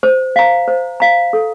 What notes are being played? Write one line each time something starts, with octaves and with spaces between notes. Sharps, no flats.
C5
F5 A#5
C5
F5 A#5
A4